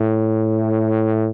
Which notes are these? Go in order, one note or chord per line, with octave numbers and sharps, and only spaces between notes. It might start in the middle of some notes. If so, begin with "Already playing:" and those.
Already playing: A2